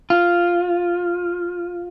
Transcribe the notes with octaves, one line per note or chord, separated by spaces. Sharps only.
F4